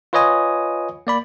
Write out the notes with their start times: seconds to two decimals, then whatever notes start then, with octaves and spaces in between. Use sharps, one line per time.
0.13 F4 B4 C#5 D#5 G#5 D#6
1.07 A#3 D5 B5